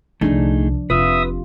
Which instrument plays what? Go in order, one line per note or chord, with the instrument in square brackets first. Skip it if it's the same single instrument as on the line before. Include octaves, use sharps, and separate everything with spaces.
[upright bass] C2 D3 [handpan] F3 D4 [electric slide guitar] A3 D#4 G#4
[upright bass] F1 [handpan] C3 F4 [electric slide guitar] B4 [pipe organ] E5 D#6